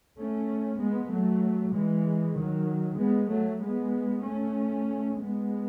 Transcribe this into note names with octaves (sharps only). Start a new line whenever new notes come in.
A3 C#4
G#3 B3
F#3 A3
E3 G#3
D#3 F#3
G#3 B3
F#3 A3
G#3 B3
A3 C#4
G#3 B3